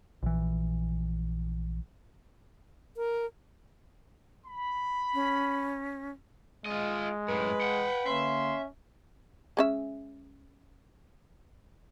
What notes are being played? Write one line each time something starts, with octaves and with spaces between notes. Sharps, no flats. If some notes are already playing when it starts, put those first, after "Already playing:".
A#1 E3
A#4
B5
C#4
G#3 F4 D#5
F#2 A2 B4
F#5 G5
D3 A#3 C#4 E5 C6
G#3 C#4 E5